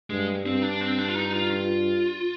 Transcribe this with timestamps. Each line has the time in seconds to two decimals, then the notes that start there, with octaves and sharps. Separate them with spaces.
0.10 G2 G#3
0.45 G2 C4
0.62 D4
0.81 C4
0.99 D4
1.08 F4
1.15 D#4
1.33 F4
1.50 F4